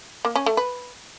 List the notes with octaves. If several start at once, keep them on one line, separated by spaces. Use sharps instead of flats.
A#3
C#4
A3
B4